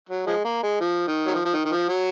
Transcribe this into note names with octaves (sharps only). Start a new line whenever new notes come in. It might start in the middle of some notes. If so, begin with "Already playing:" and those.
F#3
F3 G#3
A#3
G#3
F3
D#3
F#3
F3
F3
D#3
D#3
F3
F#3